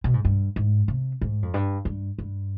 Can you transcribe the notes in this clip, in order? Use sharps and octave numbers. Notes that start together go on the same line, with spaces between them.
B2
G#2
G2
G#2
C3
G#2
F2
G2
G2
G2